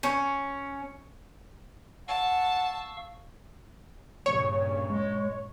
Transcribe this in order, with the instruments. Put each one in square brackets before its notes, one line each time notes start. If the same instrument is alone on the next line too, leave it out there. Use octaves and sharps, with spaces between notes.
[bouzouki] C#4
[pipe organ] F5 C#6 E6 [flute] F#5 [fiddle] A5
[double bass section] G2 A#2 C#3 [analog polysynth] C#5
[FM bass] G#3